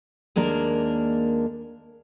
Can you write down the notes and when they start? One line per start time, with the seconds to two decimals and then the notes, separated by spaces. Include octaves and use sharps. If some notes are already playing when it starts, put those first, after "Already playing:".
0.36 D#2 G#3 A#3 D4 A#4